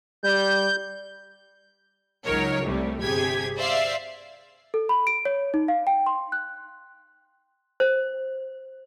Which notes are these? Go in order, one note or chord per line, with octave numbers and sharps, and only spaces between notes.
G3 G6
C#2 F#3 D#4 A#4 C#5
C2 C3 G3 A3
G1 C3 G4 G#4 G#6 B6
C5 D5 E5 F5 C7
A4
B5
D7
C#5
D#4
F5
G5
C6
F#6
C5